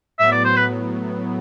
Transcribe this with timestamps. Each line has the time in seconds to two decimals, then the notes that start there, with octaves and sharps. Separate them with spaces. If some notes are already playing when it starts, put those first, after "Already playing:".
0.19 A2 F#3 B3 E5
0.32 D5
0.45 C5
0.56 B4